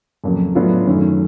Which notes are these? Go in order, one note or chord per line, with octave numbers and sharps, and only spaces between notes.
F2 C#3 F#3 A#3
A2 F#3 B3 D4 F4
F#2 D#3 F#3 A3 C#4